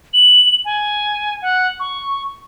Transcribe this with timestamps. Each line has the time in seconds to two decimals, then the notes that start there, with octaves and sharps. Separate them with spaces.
0.13 F#7
0.65 G#5
1.42 F#5
1.80 C#6